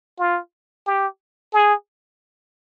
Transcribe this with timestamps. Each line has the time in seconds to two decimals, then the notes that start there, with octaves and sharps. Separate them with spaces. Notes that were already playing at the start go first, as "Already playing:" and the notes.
0.20 F4
0.87 G4
1.54 G#4